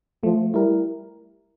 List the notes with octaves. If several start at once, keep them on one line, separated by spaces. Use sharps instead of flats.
F3 A3
G3 E4 A#4